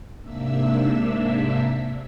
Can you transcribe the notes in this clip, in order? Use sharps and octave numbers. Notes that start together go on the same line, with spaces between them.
G#2 C3 A#3 D4 E5 E6